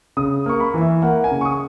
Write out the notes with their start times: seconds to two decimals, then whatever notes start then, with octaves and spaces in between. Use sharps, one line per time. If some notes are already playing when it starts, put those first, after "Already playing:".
0.17 C#3 D#6
0.46 A#3 C#6
0.60 B5
0.74 E3
0.81 E5
1.02 A#3 F#5
1.24 G#5
1.31 C#3
1.41 C#6
1.45 D#6